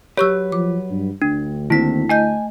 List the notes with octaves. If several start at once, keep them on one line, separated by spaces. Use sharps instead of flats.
F#3 G4 B4 C#5 C#6 E6
F3 D6
G2
D2 D4
D#3 A#3 C4 E4 B6
A3 D#5 G#5 G6